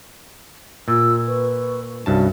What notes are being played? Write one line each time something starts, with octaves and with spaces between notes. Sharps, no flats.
A#2 F4 E6
B4 C#6
C2 G2 C#4 F#4 A5